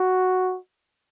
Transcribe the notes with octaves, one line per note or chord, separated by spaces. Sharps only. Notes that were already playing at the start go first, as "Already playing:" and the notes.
Already playing: F#4